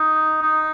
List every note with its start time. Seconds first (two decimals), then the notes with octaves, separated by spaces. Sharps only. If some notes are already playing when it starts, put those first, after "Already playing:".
Already playing: D#4
0.42 D#4